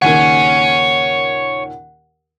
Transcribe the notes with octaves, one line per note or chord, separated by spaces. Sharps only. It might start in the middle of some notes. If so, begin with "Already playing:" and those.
D#2 A#2 C#3 C#5 F#5 G#5